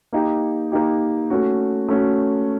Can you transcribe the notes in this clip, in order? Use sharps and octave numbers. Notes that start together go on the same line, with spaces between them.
A#3 D#4 G4
A#3 D#4 G4
A3 C#4 F#4
A3 C#4 F#4